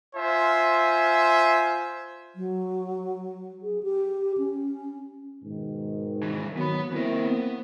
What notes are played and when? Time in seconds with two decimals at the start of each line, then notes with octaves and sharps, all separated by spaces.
0.16 F4 C5 E5 G#5
2.36 F#3
3.62 G#4
3.83 G4
4.38 C#4
5.44 G#2 B2 D#3
6.23 C2 E3
6.57 D#3 F#3 B3 B5
6.92 E3 A#3 C4 E4 A#4
7.26 B3